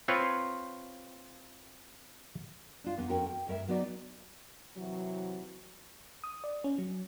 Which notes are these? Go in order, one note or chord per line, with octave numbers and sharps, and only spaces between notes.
C4 F4 B4 C#5
D4 F4
E2 B3
F2 C#4 F#4 A#4 C#5 G5
G5
D2 G2 A#4 E5
F#3 B3 D#4 F#4 D5
C3 E3 F#3
D#6
D5
C#4
F#3